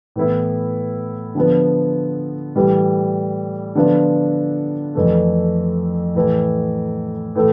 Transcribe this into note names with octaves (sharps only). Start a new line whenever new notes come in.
A2 E3 B3 E4
D3 F3 B3
A2 E3 G3
D3 F3 B3 D4 F4
F2 E3 A3
A2 E3 A3
A2 E3 A3